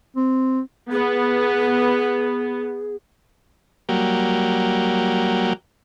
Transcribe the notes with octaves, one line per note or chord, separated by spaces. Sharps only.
C4
B3 G#4
F#3 G3 A#3